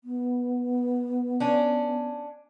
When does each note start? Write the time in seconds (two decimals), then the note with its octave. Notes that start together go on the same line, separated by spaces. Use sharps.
0.04 B3
1.40 C#4 D4